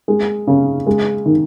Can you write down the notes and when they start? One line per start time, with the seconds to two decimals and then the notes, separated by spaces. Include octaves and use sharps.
0.08 G#3
0.47 C#3
0.87 G#3
1.26 D#3